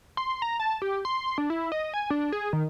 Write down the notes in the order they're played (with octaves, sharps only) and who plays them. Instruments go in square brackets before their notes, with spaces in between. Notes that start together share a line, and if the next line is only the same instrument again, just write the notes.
[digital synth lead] C6
A#5
A5
G4
C6
D4
E4
D#5
G#5
D4
G#4
D#3